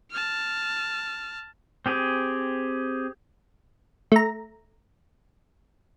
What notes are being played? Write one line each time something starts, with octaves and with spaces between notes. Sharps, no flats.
A5 F6
C4 G4 G#4
A3 A#5